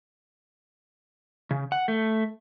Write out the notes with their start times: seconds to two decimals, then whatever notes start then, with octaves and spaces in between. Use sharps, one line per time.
1.51 C#3
1.72 F#5
1.88 A3